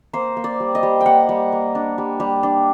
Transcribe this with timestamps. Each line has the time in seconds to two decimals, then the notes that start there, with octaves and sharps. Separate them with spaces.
0.13 A#3 C5
0.37 A#3
0.44 D5
0.60 G3
0.75 D#5
0.83 G3
1.01 G5
1.06 A#3 F#5
1.29 G3
1.52 A#3
1.75 D4
1.98 G3
2.20 G3
2.43 D4